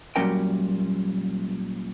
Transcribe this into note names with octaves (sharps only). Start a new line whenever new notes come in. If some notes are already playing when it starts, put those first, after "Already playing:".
A#2 F#3 G3 C#4 A#4 G5